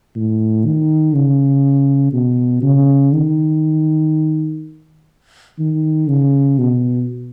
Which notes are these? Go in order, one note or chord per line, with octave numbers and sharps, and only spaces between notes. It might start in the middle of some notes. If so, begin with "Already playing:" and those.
A2
D#3
C#3
B2
C#3
D#3
D#3
C#3
B2